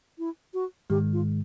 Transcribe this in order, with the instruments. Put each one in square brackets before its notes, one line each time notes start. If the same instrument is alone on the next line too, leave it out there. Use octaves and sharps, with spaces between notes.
[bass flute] E4
F#4
[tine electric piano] G#2 D#3 G#3 [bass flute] G4
[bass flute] F4